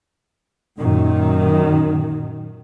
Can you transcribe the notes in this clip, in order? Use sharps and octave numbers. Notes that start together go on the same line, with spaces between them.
F#2 A#2 D#3